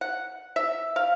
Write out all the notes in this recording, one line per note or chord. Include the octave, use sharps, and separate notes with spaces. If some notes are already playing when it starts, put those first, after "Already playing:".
F#5
E5
F5